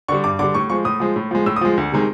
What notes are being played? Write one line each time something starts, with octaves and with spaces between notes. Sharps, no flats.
D3 G3 C#6
G2 D6
D3 G3 D6
A2 C#6
F3 G#3 C#6
A2 D#6
F3 G#3
A2
F3 G#3
A2 E6
D#6
F3 G#3
D2
C3 D#3 G#3